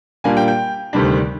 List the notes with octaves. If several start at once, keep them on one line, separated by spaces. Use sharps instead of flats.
A#2 G3 A#3 D4 G#5
G5
G5
D2 C3 D#3 G3 D4